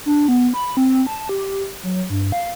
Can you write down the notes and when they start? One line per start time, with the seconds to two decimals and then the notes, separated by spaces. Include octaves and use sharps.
0.06 D4
0.28 B3
0.54 B5
0.77 C4
1.07 A5
1.29 G4
1.83 F#3
2.10 G2
2.32 F5